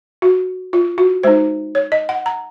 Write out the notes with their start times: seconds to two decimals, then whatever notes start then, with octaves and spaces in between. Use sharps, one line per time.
0.22 F#4
0.73 F4
0.98 F#4
1.23 G#3 D#4 C5
1.75 C#5
1.92 D#5
2.09 F#5
2.26 A#5